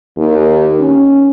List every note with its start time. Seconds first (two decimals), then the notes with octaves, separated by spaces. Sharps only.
0.17 D#2
0.79 C#4